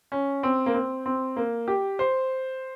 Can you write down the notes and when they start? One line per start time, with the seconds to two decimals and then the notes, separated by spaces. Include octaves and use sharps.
0.12 C#4
0.43 C4
0.66 A#3
0.74 C4
1.06 C4
1.36 A#3
1.68 G4
1.99 C5